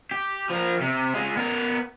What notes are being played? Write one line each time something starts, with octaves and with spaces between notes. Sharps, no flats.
G4
F3 A#4
C3
G#3 F4
B3 A#4